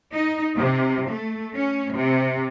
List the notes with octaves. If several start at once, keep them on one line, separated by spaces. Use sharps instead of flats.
D#4
C3
A3
C#4
C3